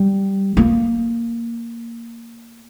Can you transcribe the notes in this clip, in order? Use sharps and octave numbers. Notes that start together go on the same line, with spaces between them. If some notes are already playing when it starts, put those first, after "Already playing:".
Already playing: G3
A#3